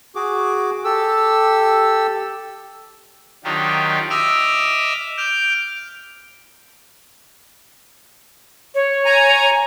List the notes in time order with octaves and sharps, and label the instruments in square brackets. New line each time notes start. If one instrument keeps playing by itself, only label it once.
[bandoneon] F#4 G#4 D6
G4 A4 E6
[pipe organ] D#3 F#3 D4 D#4 F4 G4
D#5 E5 D6 E6 F6
D6 F6 G6
[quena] C#5
[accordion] G#5 A#5